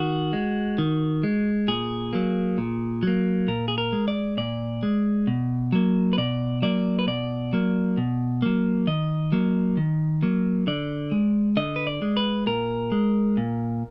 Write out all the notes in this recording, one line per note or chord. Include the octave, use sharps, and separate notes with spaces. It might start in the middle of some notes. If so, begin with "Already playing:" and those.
Already playing: D#3 F#4
G#3
D#3
G#3
A#2 G#4
F#3 A#3
A#2
F#3 A#3
A#2 A#4
G#4
A#4
G#3
D5
A#2 D5
G#3
B2
F#3 A#3
B4
B2 D5
F#3 A#3 D5
B4
B2 D5
F#3 A#3
B2
F#3 A#3
D#3 D#5
F#3 A#3
D#3
F#3 A#3
D3 D5
G#3
D3 D#5
B4
D5
G#3
B4
A#2 A#4
G#3
A#2